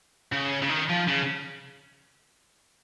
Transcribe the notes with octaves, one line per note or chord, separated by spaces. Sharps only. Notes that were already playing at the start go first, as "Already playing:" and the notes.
C#3
C#3
D#3
F3
C#3